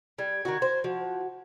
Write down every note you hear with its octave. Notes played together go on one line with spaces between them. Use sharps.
G3 G#6
D#3 F#4
C5
F3 F#4